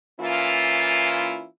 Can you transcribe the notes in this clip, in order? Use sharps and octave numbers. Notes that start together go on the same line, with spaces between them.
E3 A#3 C#4 E4 F4